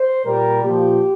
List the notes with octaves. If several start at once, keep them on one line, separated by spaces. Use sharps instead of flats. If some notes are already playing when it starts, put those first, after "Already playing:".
Already playing: C5
A#2 G3 A#4
A#2 F3 G4